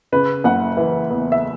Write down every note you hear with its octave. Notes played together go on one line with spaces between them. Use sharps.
C#3 B4
F#1 F#5
E3
E2
E5